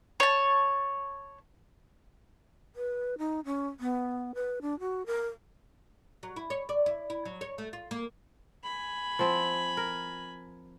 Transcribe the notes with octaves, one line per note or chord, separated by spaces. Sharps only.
C#5 A5
B4
D#4
C#4
B3
B4
D4
F#4
A#4
F#3
E4
C#5
D5
E4
E4
F#3
C#5
A3
F4
A#3
G#5 B5
F3 C4
A#4